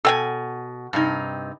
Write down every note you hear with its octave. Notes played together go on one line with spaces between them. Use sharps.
B2 A4 G5 G#5
G2 C3 D#4